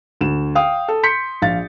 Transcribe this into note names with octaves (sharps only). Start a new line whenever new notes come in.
D2 E7
F5 G5 D#6
A4
C6 G6 B6 C#7
A#1 F5 A6